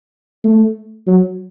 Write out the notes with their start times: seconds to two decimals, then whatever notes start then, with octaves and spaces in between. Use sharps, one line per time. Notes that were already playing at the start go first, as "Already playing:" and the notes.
0.44 A3
1.07 F#3